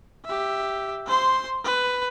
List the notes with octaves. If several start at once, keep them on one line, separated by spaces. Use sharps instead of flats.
G4 E5
C5 C6
B4